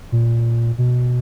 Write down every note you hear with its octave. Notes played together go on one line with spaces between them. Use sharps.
A#2
B2